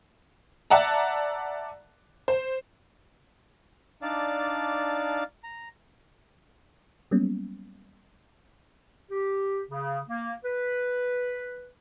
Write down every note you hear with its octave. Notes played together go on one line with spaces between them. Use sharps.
D5 E5 F#5 A5 A#5
C5
D4 D#4 D5 F5 A5
A#5
F#3 G3 A#3 B3 C#4
G4
C#3
A#3
B4